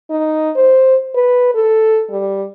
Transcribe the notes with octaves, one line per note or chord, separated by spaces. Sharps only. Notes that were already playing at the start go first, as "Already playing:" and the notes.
D#4
C5
B4
A4
G3